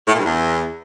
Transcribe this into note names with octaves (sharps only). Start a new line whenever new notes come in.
A2
A#2
G2
E2